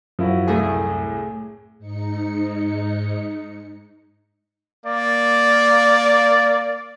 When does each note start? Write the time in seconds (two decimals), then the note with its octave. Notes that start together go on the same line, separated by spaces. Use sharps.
0.19 F#2 F3 E4 F#4
0.48 C2 A2 A3 G#4
1.78 G#2 D#4 C#7
4.86 A#3 D5